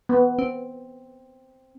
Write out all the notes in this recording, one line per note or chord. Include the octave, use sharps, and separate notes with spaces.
B3
C4